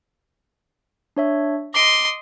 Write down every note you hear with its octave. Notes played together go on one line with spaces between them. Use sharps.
D4 C#5 E5
D#5 C6 D6 D7